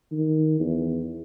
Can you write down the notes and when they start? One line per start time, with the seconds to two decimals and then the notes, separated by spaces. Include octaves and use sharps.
0.12 D#3
0.60 E2